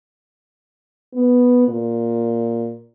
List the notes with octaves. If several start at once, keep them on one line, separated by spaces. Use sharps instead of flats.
B3
A#2